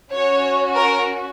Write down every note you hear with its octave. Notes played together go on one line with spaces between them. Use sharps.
C#4 F#4 C#5
A#4